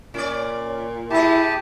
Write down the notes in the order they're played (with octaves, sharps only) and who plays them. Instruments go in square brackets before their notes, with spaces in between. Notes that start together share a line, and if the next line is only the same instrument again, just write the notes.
[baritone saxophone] A#2 [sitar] C#4 D5
[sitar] B2 G#4 [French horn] E4 [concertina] G4 A5